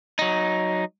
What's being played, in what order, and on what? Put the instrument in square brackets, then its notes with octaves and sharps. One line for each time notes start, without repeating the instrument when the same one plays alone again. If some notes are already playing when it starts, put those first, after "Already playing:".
[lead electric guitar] F#3 D#4